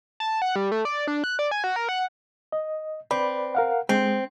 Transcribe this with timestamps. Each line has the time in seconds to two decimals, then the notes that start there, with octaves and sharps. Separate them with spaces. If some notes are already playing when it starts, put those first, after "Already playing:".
0.20 A5
0.42 F#5
0.56 G3
0.72 A3
0.85 D5
1.07 D4
1.24 F#6
1.39 D5
1.51 G#5
1.64 F#4
1.76 A#4
1.89 F#5
2.52 D#5
3.11 C4 B4 D5 B5
3.55 A#4 F5 F#5
3.89 G#3 C4